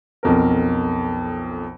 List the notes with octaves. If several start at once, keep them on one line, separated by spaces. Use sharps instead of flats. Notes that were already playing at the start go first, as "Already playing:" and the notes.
B1 F2 A#4